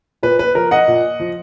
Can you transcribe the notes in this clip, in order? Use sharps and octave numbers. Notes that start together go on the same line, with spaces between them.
A#2 B4
B4
F3 A#4
D#5 F#5
A#2
F3